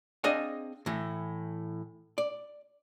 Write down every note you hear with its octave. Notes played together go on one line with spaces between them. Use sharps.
C4 D4 G#4 D#5 F5 F#5
A2 E3
D5